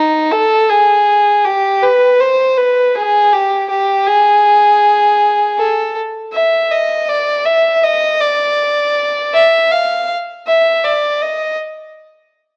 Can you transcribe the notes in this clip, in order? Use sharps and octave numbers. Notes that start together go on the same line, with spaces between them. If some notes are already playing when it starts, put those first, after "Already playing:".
Already playing: D#4
A4
G#4
G4
B4
C5
B4
G#4
G4
G4
G#4
A4
E5
D#5
D5
E5
D#5
D5
E5
F5
E5
D5
D#5